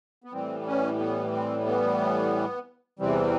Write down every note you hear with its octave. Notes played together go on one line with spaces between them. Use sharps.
B3
A2 E3 G3 C4
C#4
B3
C4
B3
E2 C3 E3 G3 C4